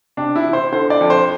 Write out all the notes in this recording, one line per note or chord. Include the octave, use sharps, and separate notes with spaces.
C3 D4
E4
E3
C5
D3 C5
D5
F2
C5